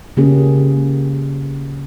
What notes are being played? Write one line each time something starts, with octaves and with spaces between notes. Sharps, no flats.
C#3 A#3 C#4 G4 G#4